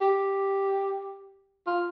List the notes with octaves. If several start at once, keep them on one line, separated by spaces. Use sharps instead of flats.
G4
F4